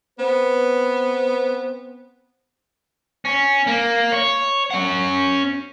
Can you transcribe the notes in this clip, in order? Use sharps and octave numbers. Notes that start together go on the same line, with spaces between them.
B3 C4 B4
C#4
A#3
C#5
C#4 F#5